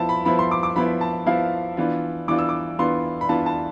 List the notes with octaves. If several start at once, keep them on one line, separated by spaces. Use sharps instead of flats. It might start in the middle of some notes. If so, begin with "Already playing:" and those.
Already playing: F3 B3 E4 A5
B5
F3 B3 E4 B5
C6
D6
D6
F3 B3 E4 B5
A5
F3 B3 E4 F5
E3 B3 D4 F4
E3 B3 D4 F4 D6
E6
D6
E3 B3 D4 F4 C6
B5
E3 B3 D4 F4 A5
A5